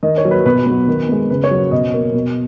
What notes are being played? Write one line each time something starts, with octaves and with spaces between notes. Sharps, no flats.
D#3 D#5
C#5
F#3 A#3
B4
B2 B4
F#3 B3
D#3
G#3 B3
C#3 B4
C#5
F#3 A#3
B2 D#5
A#3
B2